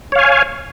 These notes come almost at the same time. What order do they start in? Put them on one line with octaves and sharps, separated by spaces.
C#5 F5 G#5